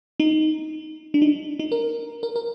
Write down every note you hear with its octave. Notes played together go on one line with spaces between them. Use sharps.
D#4
D4
D#4
D#4
A#4
A#4
A#4